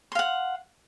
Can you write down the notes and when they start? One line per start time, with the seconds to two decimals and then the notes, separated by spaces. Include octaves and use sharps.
0.12 C6
0.15 F5
0.19 F#5